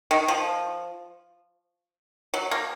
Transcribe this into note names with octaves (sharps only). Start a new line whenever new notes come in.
D#3
F3
F#3
A#3